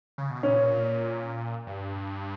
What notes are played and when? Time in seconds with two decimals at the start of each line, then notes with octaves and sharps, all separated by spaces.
0.18 C#3
0.30 B2
0.43 A#2 C#4
1.67 G2